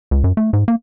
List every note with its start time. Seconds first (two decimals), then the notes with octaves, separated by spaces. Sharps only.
0.11 C#2
0.24 F#2
0.37 A3
0.53 G#2
0.68 A#3